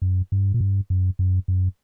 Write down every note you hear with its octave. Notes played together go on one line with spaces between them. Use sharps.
F#2
G2
A#2
G2
F#2
F#2
F#2